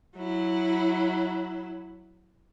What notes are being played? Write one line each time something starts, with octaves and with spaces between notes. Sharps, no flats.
F#3 E4